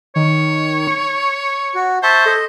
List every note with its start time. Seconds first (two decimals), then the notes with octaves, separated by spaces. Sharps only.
0.16 D#3 C#5
0.87 C#6
1.75 F#4
2.03 C5 E5 A5 C#6
2.26 A4 D#5